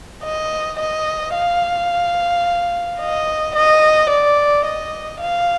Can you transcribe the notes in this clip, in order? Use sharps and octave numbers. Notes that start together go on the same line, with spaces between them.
D#5
D#5
F5
D#5
D#5
D5
D#5
F5